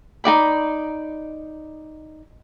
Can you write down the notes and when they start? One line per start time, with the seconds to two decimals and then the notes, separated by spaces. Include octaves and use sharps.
0.24 D#4 F#4 D5 B5